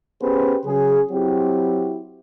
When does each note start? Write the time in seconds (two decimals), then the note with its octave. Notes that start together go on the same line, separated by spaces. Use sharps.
0.21 B3 C#4 G4 G#4 B4 C5
0.65 C#3 F#3 C#4 G#4
1.11 F#3 C4 E4 F#4 G4